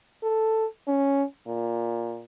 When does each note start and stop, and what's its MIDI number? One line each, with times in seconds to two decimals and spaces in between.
0.23 0.66 69
0.87 1.24 61
1.47 2.23 46